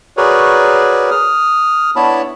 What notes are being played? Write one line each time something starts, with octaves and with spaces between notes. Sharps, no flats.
F#4 G#4 A#4 B4 C#5 D5
D#6 F6
B3 D4 E4 C#5 A5 B5